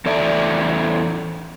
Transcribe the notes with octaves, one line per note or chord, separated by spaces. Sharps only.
E2 A4 D5 E5